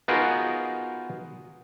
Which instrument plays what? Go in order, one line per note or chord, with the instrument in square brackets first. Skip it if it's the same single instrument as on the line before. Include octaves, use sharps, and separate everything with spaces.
[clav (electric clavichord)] B3 D#4 F4 F#4 G#4 A#4